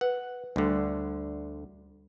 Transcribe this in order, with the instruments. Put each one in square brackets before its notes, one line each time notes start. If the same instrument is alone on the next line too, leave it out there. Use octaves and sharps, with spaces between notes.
[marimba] B4 [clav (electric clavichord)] F#5
[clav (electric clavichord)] D2 D3 [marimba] G3